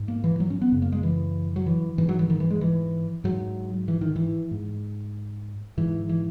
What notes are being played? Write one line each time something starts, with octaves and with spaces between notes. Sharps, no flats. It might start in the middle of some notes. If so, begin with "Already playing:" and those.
Already playing: G#2
A#3
E3
F#3
C#4
B3
F#2 C#3
A#3
G#3
E3
F#3
E3
G#2 E3
F#3
E3
D#3
E3
G#3
E3
G#2 F#3
E3
D#3
E3
G#2
G#2 E3
E3